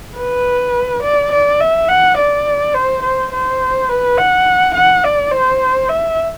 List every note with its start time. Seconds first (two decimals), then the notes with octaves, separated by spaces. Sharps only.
0.18 B4
1.03 D5
1.32 D5
1.61 E5
1.88 F#5
2.18 D5
2.74 C5
3.03 C5
3.32 C5
3.89 B4
4.17 F#5
4.75 F#5
5.04 D5
5.31 C5
5.89 E5